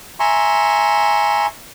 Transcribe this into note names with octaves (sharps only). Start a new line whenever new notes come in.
E5 G#5 A#5 C6 C#6